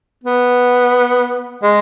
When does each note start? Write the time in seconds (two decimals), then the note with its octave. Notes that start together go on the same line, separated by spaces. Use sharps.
0.24 B3
1.63 G#3